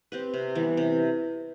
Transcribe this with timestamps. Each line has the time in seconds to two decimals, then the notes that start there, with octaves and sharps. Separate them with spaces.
0.12 C4 G4 B4
0.34 C3
0.55 E3 G3 B3
0.77 C3